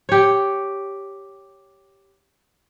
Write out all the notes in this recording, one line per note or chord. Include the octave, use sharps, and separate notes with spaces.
G4 C#5